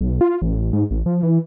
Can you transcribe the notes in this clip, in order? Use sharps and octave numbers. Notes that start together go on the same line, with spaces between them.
B1
F4
A1
G#2
A1
F3
E3